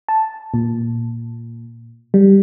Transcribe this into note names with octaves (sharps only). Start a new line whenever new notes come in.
A5
A#2
G3